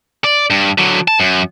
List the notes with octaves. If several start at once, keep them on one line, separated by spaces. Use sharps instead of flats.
D5
G2
D3 F#3
A5
F#2